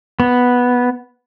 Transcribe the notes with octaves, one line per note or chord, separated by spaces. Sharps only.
B3